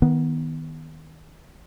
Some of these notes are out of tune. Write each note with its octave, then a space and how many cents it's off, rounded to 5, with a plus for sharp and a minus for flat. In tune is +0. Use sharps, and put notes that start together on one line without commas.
D#3 +20 B3 -10